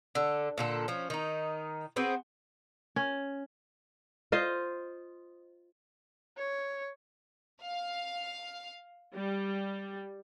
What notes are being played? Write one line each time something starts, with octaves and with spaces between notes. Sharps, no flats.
D3 A4
A#2 D3 A4
F3 C#4
D#3 D#4
C4 F#4 G#4 B4
C#4
F4 C5 D#5
C#5
F5
G3